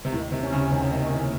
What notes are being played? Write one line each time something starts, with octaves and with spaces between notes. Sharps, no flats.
C3
D#2 A2
C3
C#4
C#3
C3 D#3
C3
C#4
A2